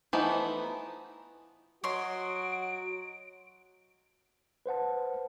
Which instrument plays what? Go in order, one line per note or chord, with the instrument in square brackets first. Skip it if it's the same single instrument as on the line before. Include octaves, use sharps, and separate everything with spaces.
[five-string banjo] E3 F3 A3 B3 D#4
[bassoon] F#3 [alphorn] F#4 [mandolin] C#5 D#5 C6 [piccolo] D7
[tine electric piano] B4 C5 F#5 A5